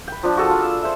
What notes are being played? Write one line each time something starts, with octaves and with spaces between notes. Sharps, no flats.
B4 G5
F3 D4
F#4 G#4 A4
F4
E6
C5 E5